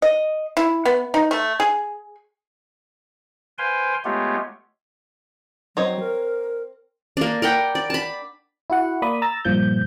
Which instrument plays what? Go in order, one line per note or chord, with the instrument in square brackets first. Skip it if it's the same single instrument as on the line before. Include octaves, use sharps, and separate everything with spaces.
[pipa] D#5
E4
B3
D#4
A3
G#4
[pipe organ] B4 C5 F5 G5 G#5 C6
G#3 A3 B3 F4 G4 C#5
[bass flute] F#3 [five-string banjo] C4 C#5 D#5
[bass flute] A#4
[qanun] A#3 D4
A#4 F#5 G5 B5
D5
A5 B5
[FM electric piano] E4 F#4 F#5
A#3 D5 B5 D#6
A#5 E6 A6
G2 A#2 F3 G6